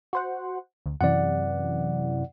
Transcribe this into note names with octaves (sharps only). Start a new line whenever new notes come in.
F#4 C5 F#5
D2
F#2 C3 E3 D5 F#5